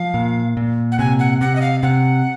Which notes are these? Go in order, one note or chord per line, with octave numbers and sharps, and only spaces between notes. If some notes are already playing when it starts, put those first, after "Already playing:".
Already playing: F3 F5
A#2
A#2
F#5
C3 G#5
F#5
C3 F#5
D#5
F5
C3 F#5